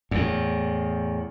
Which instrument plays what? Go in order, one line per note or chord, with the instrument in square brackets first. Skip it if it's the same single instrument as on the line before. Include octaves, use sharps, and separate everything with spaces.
[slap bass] E2 A2